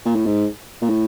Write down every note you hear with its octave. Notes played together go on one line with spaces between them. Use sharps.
A#2
A2
G#2
A#2
A2